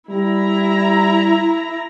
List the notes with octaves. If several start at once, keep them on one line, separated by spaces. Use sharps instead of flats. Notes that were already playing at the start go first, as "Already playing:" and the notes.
G3 E4 A#5